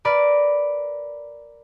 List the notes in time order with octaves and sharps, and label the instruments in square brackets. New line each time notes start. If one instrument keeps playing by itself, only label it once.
[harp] A#4 B4 D5 D6